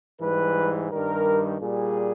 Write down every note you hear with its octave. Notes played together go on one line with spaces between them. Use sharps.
G#2 E3 G3 B4
G2 D#3 G3 A#4
A#2 G3 G#4